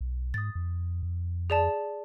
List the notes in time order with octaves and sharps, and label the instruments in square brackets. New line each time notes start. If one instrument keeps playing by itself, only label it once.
[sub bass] B1
[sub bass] G#2 [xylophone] D#6 A6
[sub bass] F2
F2
[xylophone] G#4 D5 A5